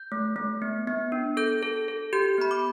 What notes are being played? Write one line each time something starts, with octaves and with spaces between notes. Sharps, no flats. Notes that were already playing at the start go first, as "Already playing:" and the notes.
Already playing: G6
A3
A3
B3
B3
D4
A4 G6
A4
A4
G4 G6
B3 B5
D6